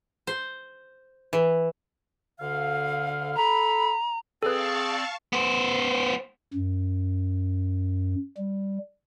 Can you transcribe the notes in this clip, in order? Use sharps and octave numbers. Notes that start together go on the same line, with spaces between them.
C5
E3
D2 D3 F5
A4 A#5 B5
C4 G#4 A4 B4 D5 F5 A5 C#6
B3 C5
F#2
G3